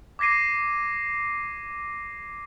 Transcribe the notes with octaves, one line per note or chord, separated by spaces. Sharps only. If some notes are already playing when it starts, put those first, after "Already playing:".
D6 G#6 A#6 C7 D#7